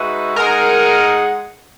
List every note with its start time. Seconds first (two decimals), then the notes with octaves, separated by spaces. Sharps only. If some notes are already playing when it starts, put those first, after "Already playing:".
Already playing: G#3 D#4 F#4 B4 E5
0.36 G#3 D#4 G#4 A#4 D#5 F#5